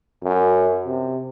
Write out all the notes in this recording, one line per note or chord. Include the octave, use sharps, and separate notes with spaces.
F#2
C3